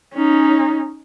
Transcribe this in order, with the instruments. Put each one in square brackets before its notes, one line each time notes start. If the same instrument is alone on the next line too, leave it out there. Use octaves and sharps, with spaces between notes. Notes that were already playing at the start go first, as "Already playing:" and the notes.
[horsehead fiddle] C#4 D#4